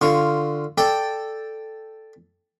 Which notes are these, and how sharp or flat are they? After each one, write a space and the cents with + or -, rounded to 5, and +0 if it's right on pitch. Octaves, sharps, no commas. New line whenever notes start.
D3 +10 F4 -5 C#6 +0
A4 +0 D5 +0 G5 +0